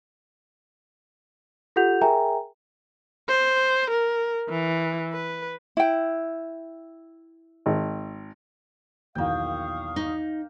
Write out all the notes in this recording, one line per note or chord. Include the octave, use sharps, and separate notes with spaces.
F4 G4 A4 F#5 G6 F7
G#4 A#4 E5 G5 G#5 A#5
C5
A#4
E3
B4
E4 G5
G#1
B1 E2 D#3 A#3 F5 G5 C#6 D#6
D#4